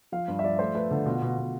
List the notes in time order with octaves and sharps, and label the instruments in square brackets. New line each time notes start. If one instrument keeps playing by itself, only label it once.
[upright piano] F3 [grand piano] F5
[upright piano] G2
[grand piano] E5
[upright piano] F3 [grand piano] D5
[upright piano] A3 [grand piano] C5
[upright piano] A3 [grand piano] B4
[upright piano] D3 [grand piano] A4
[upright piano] B2 [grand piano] F4
[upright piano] B2
[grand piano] F4
[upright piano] B2